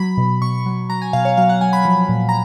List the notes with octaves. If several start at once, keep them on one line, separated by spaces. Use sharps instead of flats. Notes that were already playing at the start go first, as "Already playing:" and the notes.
Already playing: F#3 B5
B2
B2 C#6
C#6
F#3
F#3 A#5
G#5
B2 F5
C#5
F#3 F5
F#5
F#3 G#5
B5
F3
A#2
A#5